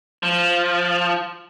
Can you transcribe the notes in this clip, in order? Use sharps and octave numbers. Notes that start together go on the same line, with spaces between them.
F3